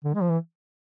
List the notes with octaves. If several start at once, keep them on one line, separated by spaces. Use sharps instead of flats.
D3
G#3
F3
E3